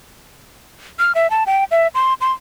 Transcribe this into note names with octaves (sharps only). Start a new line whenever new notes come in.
F6
E5
A5
G5
E5
C6
C6